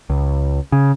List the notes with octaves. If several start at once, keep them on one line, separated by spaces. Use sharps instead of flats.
C#2
C#3